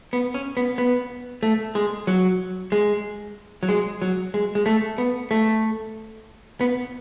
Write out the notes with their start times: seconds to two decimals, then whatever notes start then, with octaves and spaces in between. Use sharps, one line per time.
0.13 B3
0.34 C#4
0.57 B3
0.78 B3
1.43 A3
1.75 G#3
2.07 F#3
2.72 G#3
3.63 F#3
3.69 G#3
4.02 F#3
4.34 G#3
4.55 G#3
4.66 A3
4.98 B3
5.31 A3
6.61 B3